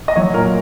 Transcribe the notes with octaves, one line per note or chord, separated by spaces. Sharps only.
D#5
F#3 C#5
A#2 A#4